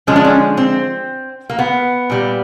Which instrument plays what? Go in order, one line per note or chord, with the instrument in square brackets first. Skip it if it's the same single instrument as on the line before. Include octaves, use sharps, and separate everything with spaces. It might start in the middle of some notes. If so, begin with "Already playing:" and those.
[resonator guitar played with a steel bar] D3 F3 G#3 C#4
D4
C#4
C4
A#3
B3
A#2 G3